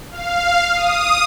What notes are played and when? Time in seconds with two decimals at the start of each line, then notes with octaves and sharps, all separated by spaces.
0.11 F5
0.74 D#6